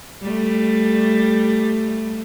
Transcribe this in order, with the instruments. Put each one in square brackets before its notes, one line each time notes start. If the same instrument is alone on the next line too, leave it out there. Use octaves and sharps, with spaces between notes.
[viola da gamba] G3 A3